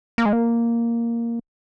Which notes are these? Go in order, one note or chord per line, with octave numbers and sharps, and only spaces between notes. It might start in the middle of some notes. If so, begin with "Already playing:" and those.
A#3
G#3
A#3